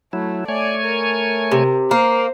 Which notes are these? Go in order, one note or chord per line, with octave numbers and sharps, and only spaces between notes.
F#3 A3 E4
A3 C#5 D5 G#5
A#4
C3
A#3 C5